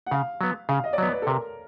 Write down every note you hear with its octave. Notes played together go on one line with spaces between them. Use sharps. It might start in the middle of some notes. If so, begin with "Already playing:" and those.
F#5
C#3 F5
F#3 B3
C#3 F5
D#5
D5
F#3 B3 C#5
B4
A4
C3 A#4